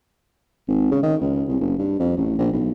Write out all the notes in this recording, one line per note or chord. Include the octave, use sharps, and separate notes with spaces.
G#1
C#3
D#3
C#2
C2
F#1
G2
F2
A1
A#1
B1